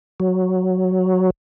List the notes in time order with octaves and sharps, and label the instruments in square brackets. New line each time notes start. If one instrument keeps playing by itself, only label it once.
[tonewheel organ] F#3